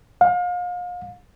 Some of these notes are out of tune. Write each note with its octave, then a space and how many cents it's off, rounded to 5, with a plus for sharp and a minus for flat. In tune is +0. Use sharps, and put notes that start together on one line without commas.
F5 +35